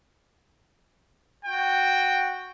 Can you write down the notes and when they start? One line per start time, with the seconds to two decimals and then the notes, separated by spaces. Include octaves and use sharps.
1.45 F#4 G5